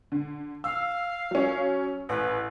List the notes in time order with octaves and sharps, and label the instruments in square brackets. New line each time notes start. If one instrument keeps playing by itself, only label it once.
[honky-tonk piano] D3
[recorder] F5 [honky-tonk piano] E6
[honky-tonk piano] F#3 C#4
[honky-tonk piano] A1 [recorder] B4